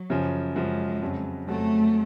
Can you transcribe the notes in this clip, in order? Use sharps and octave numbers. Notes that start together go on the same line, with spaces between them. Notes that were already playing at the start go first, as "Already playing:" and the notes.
Already playing: F#3
F#2 C#3 F3
F#2 C#3 F3 G#3
F2 C#3 F#3
F2 C#3 F#3 A3